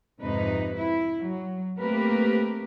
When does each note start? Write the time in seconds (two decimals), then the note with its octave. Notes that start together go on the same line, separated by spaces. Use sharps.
0.20 F2 G#2 C3 D#4 B4
0.76 E4
1.21 F#3
1.78 A3 A#3 C4 G4 A#4 B4